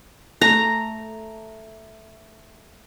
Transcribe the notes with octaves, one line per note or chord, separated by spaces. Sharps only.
A3 A#5